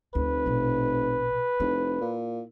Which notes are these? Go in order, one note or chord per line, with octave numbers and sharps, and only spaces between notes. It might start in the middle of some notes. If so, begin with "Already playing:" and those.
F1 D2 B4
A#1 B2
F1 E4
A#2